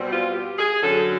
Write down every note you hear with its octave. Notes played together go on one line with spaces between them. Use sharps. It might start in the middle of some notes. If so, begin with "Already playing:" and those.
Already playing: B2 G3 C4
F4
G4
G#4
F#2 D3 F#3 A4